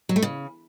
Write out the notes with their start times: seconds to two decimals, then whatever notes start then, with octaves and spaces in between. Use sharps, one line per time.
0.09 F#3
0.16 A3
0.22 C#3